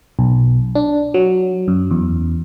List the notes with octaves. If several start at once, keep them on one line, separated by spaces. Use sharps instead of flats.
B1
D4
F#3
F#2
E2